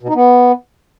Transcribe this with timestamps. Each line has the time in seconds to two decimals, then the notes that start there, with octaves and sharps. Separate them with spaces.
0.03 B2
0.09 D#4
0.15 B3